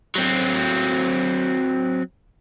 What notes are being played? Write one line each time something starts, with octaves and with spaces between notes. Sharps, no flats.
F#3 C4